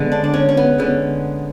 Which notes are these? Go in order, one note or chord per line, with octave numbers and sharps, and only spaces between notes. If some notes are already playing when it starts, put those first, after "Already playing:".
Already playing: D3 G#3 B3
D4
D4
C#4
C#4
B3
D3 G#3 B3 C#4